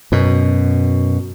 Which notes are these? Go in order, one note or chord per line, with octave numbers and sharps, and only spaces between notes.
F#2 B2